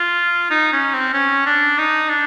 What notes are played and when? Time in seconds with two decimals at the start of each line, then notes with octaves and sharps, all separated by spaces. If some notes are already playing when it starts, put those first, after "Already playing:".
Already playing: F4
0.50 D#4
0.73 C#4
0.94 C4
1.14 C#4
1.46 D4
1.78 D#4
2.09 D4